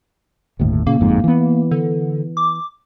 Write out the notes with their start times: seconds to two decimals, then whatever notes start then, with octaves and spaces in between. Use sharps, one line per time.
0.59 G1 D#2 A2
0.87 A#2 C#3 A#3
1.00 G1 F2 G#2
1.24 E3 B3
1.71 D3
2.37 D6